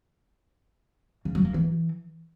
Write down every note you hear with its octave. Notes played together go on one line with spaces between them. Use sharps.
C#3
F#3
A#3
E3